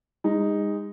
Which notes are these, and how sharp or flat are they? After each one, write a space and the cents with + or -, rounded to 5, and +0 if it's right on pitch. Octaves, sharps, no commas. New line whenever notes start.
G#3 -35 D#4 +0